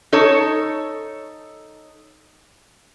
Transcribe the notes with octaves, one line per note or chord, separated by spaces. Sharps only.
D#4 A4 C#5